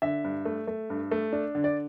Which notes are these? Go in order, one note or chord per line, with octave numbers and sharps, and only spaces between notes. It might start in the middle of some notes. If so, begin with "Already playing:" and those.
D3 E5
G2
A3
A3
G2
A3
D4
D3
D5